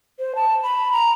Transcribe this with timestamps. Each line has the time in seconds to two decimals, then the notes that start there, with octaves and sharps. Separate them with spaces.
0.19 C5
0.35 A5
0.63 B5
0.92 A#5